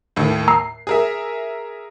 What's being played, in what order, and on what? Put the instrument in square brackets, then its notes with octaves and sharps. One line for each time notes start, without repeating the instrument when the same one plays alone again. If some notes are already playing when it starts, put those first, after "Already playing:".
[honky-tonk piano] D#2 A2
[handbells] A#5 E6 [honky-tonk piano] C7
[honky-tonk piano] G#4 A#4 E5